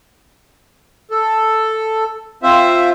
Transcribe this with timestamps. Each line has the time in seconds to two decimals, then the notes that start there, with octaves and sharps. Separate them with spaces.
1.11 A4
2.43 C4 F4 C5 E5